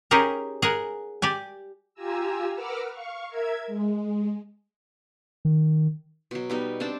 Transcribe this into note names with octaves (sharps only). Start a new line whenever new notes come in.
C#4 D#4 G4 G#4 A#4
G#4 A#4 F#5
G4 D5 G#5
F4 G4 G#5 A#5 E6
A#4 B4 F#5 D6 E6 F6
F5 C#6
A#4 E5 G#6
G#3
D#3
B2 F#3
G3 B3 D#4
C4 D4 G5 A5